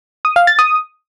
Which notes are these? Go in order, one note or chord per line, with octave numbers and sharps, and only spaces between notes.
D#6
F5
A6
D#6